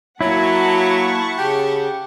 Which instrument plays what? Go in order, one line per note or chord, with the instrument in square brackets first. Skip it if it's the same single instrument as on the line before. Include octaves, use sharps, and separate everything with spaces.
[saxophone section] F#3 [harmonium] A#3 [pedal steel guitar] E4 [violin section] F#5 A5 C#6
[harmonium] C#3 [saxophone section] G4